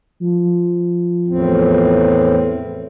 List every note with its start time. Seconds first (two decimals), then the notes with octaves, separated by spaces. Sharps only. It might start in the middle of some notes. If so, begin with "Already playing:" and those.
0.22 F3
1.28 E2 A2 C4